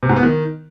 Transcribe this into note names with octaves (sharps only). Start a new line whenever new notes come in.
C3
G#2
B3
D#3